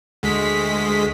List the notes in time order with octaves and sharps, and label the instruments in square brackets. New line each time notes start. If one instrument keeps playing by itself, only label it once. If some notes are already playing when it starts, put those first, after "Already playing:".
[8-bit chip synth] D2 G#3 B6